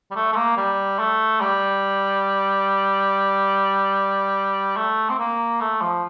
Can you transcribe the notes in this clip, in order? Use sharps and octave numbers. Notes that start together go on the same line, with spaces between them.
G3
A3
A3
A#3
G3
A3
G3
A3
C4
A#3
A3
F3